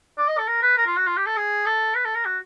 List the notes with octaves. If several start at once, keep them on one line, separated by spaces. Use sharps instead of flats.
D5
D#5
A4
A#4
B4
A#4
F4
F#4
F4
G4
A4
G#4
A4
B4
A4
A#4
F#4